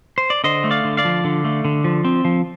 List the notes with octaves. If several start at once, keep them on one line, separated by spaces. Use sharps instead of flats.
C5
D5
D3 C5 D#5
A3
D5 F5
D3
D5 F5
F3
D3
A3
D3
F3
C4
F3